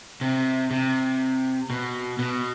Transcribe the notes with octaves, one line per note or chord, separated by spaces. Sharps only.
C3
C3
B2
B2